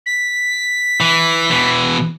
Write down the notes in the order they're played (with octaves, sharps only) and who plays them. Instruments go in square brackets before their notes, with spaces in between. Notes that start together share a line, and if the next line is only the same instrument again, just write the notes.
[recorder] B6
[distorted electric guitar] E3
B2 E3